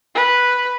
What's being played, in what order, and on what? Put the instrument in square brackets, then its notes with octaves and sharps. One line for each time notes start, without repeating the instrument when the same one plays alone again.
[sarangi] B4